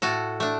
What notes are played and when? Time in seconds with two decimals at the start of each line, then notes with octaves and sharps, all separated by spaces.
0.02 A2 F#4 A4
0.40 A3 D4